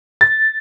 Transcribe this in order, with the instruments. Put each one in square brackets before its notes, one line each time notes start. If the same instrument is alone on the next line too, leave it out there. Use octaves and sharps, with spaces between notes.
[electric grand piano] A6